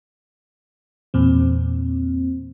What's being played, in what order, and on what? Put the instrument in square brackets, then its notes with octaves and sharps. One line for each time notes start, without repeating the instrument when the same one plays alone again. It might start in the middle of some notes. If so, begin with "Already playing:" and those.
[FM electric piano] E2 A#2 C4